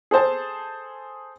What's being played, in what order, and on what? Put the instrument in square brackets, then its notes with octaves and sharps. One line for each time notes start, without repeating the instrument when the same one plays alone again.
[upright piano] G#4 A4 C5 A5